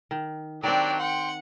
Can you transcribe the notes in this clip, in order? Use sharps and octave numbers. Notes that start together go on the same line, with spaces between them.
D#3
D#3 F#3 C4 D4 G4 D5
F#5 G5 C6 C#7